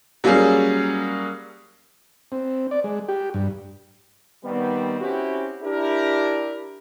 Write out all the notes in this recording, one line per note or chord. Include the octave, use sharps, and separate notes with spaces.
F#3 G3 A#3 C#4 G#4
C4
D5
G#3
G4
G2
D#3 G3 B3 C4
C4 C#4 E4 F#4 G4
D4 E4 G4 A#4